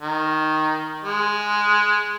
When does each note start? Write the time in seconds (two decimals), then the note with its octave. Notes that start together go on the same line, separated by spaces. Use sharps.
0.01 D#3
1.04 G#3